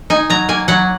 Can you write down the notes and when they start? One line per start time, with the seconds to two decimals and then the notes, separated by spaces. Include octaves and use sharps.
0.10 D#4 G#5
0.30 F#3 A#5
0.49 A#3 G#5
0.68 F#3 F#5